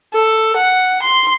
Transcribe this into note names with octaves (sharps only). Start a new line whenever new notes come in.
A4
F#5
C6